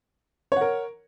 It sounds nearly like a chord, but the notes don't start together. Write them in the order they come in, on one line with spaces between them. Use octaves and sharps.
C#5 F#5 A#4